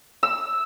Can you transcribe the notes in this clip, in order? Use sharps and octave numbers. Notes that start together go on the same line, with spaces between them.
E6